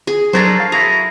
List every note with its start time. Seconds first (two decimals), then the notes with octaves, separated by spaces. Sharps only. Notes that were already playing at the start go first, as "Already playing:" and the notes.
0.07 G#4
0.33 F#3 D4 A4 A#4 C5
0.60 F5
0.72 E4 F#4 G#4 A#5